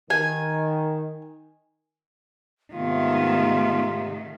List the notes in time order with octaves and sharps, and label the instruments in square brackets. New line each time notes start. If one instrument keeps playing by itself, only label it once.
[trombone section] D#3 [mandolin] G#5
[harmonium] G#2 C3 [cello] D#3 A3 [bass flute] B3 [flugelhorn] F4